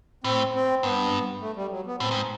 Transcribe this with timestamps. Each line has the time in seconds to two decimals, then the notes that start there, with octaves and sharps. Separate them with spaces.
0.24 A2 C4
0.54 C4
0.83 G2 B3
1.41 A3
1.56 G3
1.71 F#3
1.86 B3
2.00 A2 C4
2.11 G#2